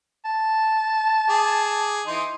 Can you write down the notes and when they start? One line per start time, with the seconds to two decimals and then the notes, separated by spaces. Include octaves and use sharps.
0.25 A5
1.30 G#4 D6
2.07 E3 D#4 C6